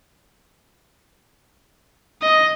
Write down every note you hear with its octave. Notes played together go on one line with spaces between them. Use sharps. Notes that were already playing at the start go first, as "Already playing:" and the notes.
D#5